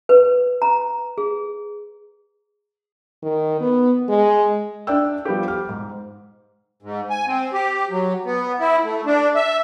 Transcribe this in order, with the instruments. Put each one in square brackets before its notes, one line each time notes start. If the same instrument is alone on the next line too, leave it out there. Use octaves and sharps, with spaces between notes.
[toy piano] B4
A#5
G#4
[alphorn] D#3
B3
G#3
[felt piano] D4 D5 E5 G5 E6
F3 G3 B3 G4
G5 D6 F6
G#2
[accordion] G#2
G#5
C4
G4
F#3
B3
E4
A3
D4
E5